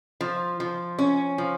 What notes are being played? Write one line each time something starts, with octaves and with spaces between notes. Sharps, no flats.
F3
F3
C#4
F3